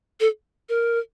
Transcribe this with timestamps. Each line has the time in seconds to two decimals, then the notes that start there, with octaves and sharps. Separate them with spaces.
0.20 A4
0.69 A#4